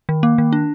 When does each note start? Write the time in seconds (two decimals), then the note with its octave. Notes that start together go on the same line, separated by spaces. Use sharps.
0.09 D#3
0.23 A#3
0.38 D#3
0.53 D4